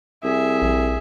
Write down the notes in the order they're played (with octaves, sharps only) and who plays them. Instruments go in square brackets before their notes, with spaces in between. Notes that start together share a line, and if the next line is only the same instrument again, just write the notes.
[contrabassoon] C2 [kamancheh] G#4 E5
[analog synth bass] A#1